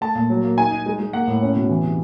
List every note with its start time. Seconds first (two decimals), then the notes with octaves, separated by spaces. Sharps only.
0.01 A3 A5
0.15 A#2
0.29 F#3
0.44 A#3
0.57 D#4 G#5
0.71 D#4
0.86 G#3
0.99 G#3
1.13 A#3 F#5
1.27 A2
1.42 C#4
1.56 B2
1.69 E3
1.84 C3